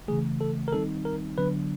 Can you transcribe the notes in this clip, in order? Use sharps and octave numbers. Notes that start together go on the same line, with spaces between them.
C#3 E3 A3 G#4
A4
A#4
D#3 G3 C4 D#4 A4
A#4
D3 F#3 B3 D4 B4